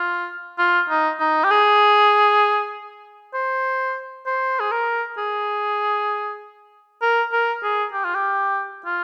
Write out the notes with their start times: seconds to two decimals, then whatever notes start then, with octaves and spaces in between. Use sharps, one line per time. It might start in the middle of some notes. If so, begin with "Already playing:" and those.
Already playing: F4
0.58 F4
0.89 D#4
1.20 D#4
1.44 G4
1.51 G#4
3.34 C5
4.26 C5
4.60 G#4
4.72 A#4
5.18 G#4
7.02 A#4
7.32 A#4
7.63 G#4
7.93 G4
8.05 F4
8.15 G4
8.86 F4